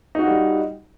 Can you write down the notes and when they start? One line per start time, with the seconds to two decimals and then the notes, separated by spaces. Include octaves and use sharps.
0.15 D#4
0.19 F#4
0.23 F4
0.27 G3